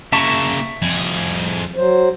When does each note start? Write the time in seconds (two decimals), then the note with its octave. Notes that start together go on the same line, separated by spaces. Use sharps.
0.13 C#3 A#3 E5 A5 C#6
0.82 F2 G#4
1.76 F#3 C5